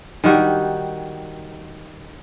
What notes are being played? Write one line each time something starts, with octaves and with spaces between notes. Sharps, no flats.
D#3 G3 F#4